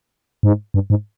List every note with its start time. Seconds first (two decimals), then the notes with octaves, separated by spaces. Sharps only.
0.43 G#2
0.74 G2
0.90 G#2